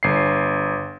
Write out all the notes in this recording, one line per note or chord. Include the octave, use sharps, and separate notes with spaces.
G1 C7